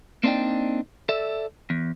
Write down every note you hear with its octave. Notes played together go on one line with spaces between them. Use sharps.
A#3 C4 D4 D#4 D5 G5
A4 D5 E5
E2